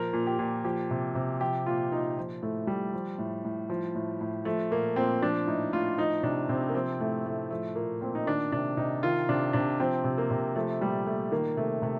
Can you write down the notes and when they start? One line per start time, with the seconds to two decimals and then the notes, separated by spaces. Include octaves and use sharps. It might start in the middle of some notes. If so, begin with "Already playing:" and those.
Already playing: A#2 F3 A#4
0.13 A#2
0.27 G4
0.39 A#2
0.64 F3 G4
0.91 C3
1.15 C3
1.40 F3 G4
1.66 A#2 F4
1.92 A#2 D#4
2.18 F3
2.42 A2 A3
2.67 A2 G3
2.93 F3
3.18 A2
3.45 A2
3.70 F3
3.95 A2
4.21 A2
4.45 F3 A3
4.71 A#2 A#3
4.96 A#2 C4
5.22 F3 D4
5.47 A2 D#4
5.73 A2 F4
5.98 F3 D#4
6.23 C3 D4
6.49 C3 C4
6.69 A#3
6.74 F3 C4
7.00 A2 A3
7.26 A2 A3
7.50 F3 A3
7.75 A#2 A#3
8.01 A#2 C4
8.15 D#4
8.27 D#3 D4
8.52 C3 D4
8.77 C3 D#4
9.03 D#3 F4
9.29 C3 D4
9.53 C3 D4
9.80 F3 C4
10.04 C3
10.18 A#3
10.31 C3
10.56 F3 A3
10.81 A#2 G3
11.06 A#2 A3
11.32 D#3 A#3
11.57 C3 A3
11.82 C3 A3